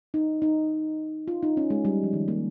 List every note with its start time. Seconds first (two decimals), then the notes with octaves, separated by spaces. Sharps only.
0.14 D#4
0.42 D#4
1.28 F4
1.43 D#4
1.57 C#4
1.70 G#3
1.85 G3
2.03 F3
2.13 D#3
2.28 A#3